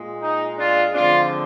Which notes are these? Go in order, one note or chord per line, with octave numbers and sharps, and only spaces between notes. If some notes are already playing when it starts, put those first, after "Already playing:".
Already playing: A#2 G#3
D#4
D4 F4
D3 F3 G#3 C4 D4 F4